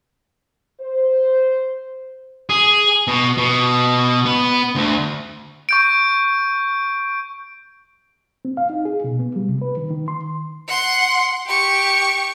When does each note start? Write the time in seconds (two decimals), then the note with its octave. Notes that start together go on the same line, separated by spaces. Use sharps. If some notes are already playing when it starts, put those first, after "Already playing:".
0.81 C5
2.49 G#4
3.07 B2
3.38 B2
4.26 B3
4.75 D2
5.69 C#6 G6 D7
8.45 C4
8.57 F5
8.70 D#4
8.85 G#4
9.04 B2
9.19 B3
9.36 G3
9.49 C3
9.62 B4
9.77 D#3
9.90 D#3
10.08 C6
10.68 F#5 C6
11.46 G4 C#6